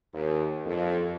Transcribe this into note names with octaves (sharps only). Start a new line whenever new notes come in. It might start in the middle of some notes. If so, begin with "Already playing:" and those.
D#2
F2